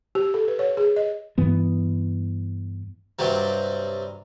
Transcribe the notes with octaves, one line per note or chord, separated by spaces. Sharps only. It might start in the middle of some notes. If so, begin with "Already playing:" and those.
G4
A4
B4
C#5
G#4
D#5
G2 E3 B3
G2 C3 F#3 G3